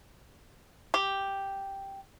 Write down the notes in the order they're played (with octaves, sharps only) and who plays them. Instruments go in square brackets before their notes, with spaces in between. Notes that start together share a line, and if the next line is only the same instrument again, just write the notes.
[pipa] G4